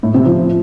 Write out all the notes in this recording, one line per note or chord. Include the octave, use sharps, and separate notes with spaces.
A2
C3
F3